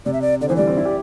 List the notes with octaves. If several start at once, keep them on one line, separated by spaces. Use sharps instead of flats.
C3 D5
E5
D5
D3 D5
E3 C5
G3 D5
C4
E4
G4